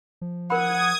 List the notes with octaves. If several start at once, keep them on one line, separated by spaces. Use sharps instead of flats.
F3
A#4 F#5 B5 D#6 G#6